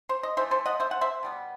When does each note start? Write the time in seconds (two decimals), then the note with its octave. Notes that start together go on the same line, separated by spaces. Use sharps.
0.09 C5
0.23 D#5
0.37 E3 A3 C5 E5
0.51 A4 C5
0.66 D#5 F#5
0.80 C5 E5
0.91 F#5
1.01 C5 E5
1.23 B2 G3 B3